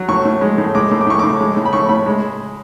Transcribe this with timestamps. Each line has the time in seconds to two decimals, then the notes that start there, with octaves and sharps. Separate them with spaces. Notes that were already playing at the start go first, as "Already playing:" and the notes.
Already playing: F#3
0.08 A2 C#6
0.25 A2
0.41 G#3
0.58 A2
0.75 G#3 D6
0.91 A2
1.01 D6
1.07 A2 C#6
1.19 A2 D6
1.40 G#3
1.57 A2
1.65 B5
1.73 A2 C#6
1.89 A2 B5
2.06 G#3